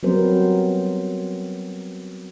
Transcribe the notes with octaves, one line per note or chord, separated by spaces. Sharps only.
F#3 G3 B3 C4 A#4 C5